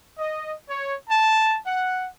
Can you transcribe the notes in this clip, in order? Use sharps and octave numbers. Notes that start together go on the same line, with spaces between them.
D#5
C#5
A5
F#5